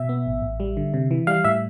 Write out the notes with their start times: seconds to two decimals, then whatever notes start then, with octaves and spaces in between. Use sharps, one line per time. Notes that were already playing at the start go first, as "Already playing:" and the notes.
Already playing: B2 E5
0.09 B3
0.26 A1
0.42 A1
0.60 G3
0.77 D3
0.94 C3
1.11 E3
1.27 G3 F5
1.44 A2 E5